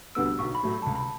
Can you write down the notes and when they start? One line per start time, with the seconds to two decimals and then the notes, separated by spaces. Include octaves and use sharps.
0.15 D2 D3 G3 B3 E6
0.39 B1 C#6
0.55 B5
0.63 A2 F#3 A3
0.70 B5
0.82 C#2 A5
0.96 B5